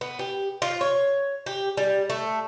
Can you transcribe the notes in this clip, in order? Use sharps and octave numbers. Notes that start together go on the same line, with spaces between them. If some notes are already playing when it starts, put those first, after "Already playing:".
B3
G4
F4
C#5
G4
G3
A3